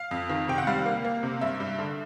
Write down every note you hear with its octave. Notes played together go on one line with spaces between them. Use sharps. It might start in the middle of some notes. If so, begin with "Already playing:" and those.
Already playing: F5
F2
D#3
C3 G5
F#5
G3 F5
A#3
A#3
C3
G2 E5
G2
D3